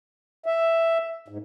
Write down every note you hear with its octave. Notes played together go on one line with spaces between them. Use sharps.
E5
G#2